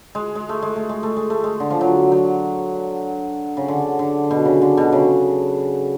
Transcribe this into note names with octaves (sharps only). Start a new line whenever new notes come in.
G#3
G#3
A3
G#3
A3
G#3
A3
G#3
A3
G#3
D3
F3
F#3
F#3
C#3
D3
D3
B2
C#3
D3
B2
C#3